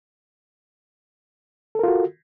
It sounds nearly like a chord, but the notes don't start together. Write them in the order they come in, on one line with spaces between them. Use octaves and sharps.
A4 A#4 F4 F#4